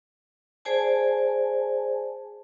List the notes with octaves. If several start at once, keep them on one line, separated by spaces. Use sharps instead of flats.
G#4 C5 D5 G#5 A5